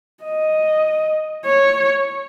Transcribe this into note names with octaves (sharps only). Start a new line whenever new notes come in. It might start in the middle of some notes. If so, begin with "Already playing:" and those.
D#5
C#5